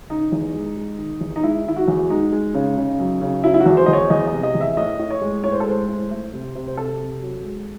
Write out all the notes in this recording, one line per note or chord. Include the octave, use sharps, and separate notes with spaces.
C#3 D#4
E2
G#3
G#3
D#3
E2
D#4
G#3 E4
D#3 E4
F#4
E2
G#3 D#4
G#3
C#3
C#3
F#2
C#3
F#3 E4
E4
F#4
E2
C5
E2 D#5
C#5
E2 D#5
D#5
C3
D#5
E2
E5
A2 D#5
A2
C#5
G#3
A2 C#5
C5
A4
G#3 C5
A2
A3
C3
C3
C5
C3 A4
C3
F#3
G#3